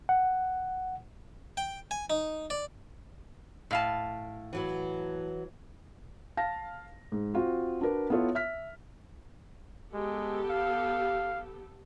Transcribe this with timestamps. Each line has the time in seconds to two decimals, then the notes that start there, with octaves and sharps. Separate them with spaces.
0.09 F#5
1.57 G5
1.91 G#5
2.10 D#4
2.50 D5
3.71 A2 F5 A5
4.53 E3 F#3 B4
6.37 F5 A5 A#6
7.12 G#2
7.34 C4 F4 F#4
7.81 D4 F#4 A#4 B4
8.10 B3 E4 F4 A4 C#5
8.35 E5 F6 B6
9.94 G#3 B3 G4 A4
10.51 F5